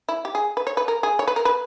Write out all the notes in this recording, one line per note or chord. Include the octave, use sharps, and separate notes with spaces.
E4
G4
G#4
B4
C#5
B4
A#4
G#4
C#5
B4
A#4
B4